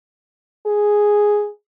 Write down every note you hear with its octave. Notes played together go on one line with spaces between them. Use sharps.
G#4